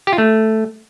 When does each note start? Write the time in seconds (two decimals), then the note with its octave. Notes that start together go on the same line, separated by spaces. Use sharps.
0.07 G4
0.13 F4
0.18 A3